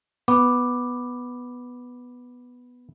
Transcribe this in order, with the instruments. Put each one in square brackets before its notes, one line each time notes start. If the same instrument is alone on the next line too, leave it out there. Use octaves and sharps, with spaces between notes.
[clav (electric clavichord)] B3 [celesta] D6